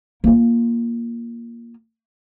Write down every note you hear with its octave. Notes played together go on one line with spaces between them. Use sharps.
A#3 F4